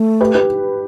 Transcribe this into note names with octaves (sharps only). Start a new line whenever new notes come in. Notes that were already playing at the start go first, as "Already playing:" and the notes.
Already playing: A3
G4 B4
G4 B4